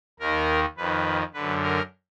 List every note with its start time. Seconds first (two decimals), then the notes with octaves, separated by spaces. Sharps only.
0.20 D#2 D#3 A#4
0.77 F2 D#3 B4
1.34 F#2 D3 B4
1.62 A#4